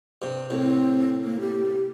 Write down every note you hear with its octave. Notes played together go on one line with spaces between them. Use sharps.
G2 C3
C2 A2 C4
A#3
G4